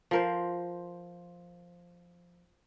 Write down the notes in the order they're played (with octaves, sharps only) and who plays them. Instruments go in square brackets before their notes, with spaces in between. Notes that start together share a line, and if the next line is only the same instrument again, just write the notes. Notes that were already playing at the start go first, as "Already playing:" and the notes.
[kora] F3 A#4 C5